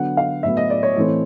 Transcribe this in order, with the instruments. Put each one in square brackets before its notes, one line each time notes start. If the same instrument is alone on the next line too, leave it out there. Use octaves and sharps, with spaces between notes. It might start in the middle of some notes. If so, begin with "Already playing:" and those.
Already playing: [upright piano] D3 F#3 B3 F#5
F5
A2 F#3 B3 E5
D#5
D5
C#5
A2 E3 A3 C4